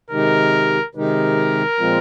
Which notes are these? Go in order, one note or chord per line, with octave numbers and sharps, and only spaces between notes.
C3 D#3 G#3 D#4 G4 A#4
C3 D#3 G#3 D#4 G4 A#4
A#2 F3 G#3 C4 F4